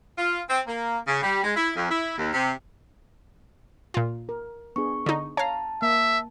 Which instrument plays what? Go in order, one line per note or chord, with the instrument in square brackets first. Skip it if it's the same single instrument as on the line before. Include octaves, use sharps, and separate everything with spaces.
[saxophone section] F4
C4
A#3
C#3
G3
G#3
E4
F2
E4
D#2
C3
[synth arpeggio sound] A#2 F4
[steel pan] A#4
[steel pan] B3 D4 G#4 [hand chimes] C#6
[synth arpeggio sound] D3 D#4
[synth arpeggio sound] C#5 F5 [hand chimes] A5 [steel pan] A#5
[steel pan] A#3 [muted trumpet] E5